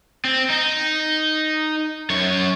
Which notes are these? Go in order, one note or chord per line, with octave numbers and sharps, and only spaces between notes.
C4
D#4
F#2 C#5